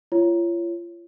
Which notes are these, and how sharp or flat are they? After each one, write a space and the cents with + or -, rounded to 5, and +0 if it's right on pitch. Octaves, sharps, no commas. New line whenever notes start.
F4 -35 C#5 +0